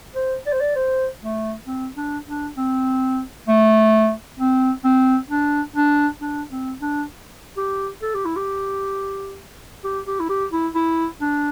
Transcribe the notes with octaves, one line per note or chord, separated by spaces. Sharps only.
C5
D5
C5
D5
C5
A3
C4
D4
D4
C4
A3
C4
C4
D4
D4
D4
C4
D4
G4
A4
G4
E4
G4
G4
G4
E4
G4
E4
E4
D4